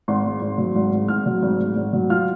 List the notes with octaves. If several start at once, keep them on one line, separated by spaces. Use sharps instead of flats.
G#1 C6
G#2
G#1
F#3
G#1
G#2
G#1 F6
F#3
G#1
G#2
G#1
F#3
F4 F6